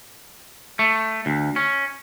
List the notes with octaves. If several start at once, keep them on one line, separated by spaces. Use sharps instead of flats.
A3
D2
C#4